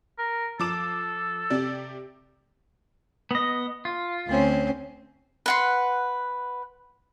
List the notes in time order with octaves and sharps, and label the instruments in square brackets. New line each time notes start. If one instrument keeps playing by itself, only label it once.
[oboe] A#4
[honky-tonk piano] F3 D6 E7 [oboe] A4
[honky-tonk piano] C3 G4 D5
[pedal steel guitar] B3 D#5
F4
[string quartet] D2 C4 C#4
[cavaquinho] B4 F#5 C6